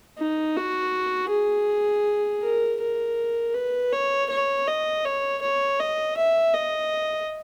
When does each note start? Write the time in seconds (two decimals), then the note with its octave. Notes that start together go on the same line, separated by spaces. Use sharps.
0.18 D#4
0.56 F#4
1.30 G#4
2.42 A#4
2.81 A#4
3.54 B4
3.92 C#5
4.30 C#5
4.67 D#5
5.05 C#5
5.42 C#5
5.80 D#5
6.17 E5
6.54 D#5